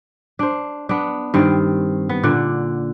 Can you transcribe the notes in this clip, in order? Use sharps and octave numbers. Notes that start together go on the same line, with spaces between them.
D4 C5
B3 D4
G2 D#3 C4
B3
A#2 D3 F#5